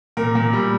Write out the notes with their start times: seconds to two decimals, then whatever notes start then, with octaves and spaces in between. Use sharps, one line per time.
0.17 A#2 A#4
0.35 A#2
0.53 G3